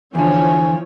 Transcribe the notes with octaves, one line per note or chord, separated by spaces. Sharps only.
E2 D3 F3 E4 C#5 G#5